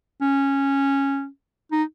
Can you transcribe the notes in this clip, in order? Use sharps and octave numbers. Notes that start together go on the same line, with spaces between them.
C#4
D#4